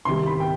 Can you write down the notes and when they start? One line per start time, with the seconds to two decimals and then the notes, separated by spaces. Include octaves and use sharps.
0.05 C2 C3 D#3 G3 C6
0.26 B5
0.40 G5